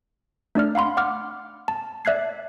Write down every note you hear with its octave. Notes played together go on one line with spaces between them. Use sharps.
A3 D4 D5 F6
F5 F#5 B5 C6
F#5 D6 F6
A5
D5 E5 F#6 G#6 C7